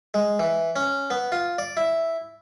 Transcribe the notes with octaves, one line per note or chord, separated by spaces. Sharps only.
G#3
E3
C#4
B3
F4
D5
E4